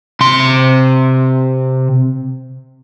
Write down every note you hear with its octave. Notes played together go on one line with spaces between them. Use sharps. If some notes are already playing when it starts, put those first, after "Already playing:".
C3 C6